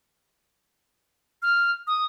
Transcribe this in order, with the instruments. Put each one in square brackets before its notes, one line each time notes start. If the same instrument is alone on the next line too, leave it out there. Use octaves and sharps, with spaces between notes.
[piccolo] F6
D#6